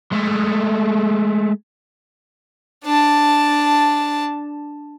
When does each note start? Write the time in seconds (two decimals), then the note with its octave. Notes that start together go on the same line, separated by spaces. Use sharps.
0.13 G#3 A3
2.85 D4 A5